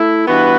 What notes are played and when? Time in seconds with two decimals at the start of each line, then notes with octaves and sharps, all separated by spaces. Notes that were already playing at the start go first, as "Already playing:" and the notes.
Already playing: A3 E4
0.27 G2 E3 B3 F#4 B4